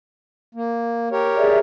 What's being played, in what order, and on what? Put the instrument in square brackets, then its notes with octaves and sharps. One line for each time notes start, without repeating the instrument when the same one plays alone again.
[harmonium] A#3
G4 A#4 C#5
[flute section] G#4 D5 E5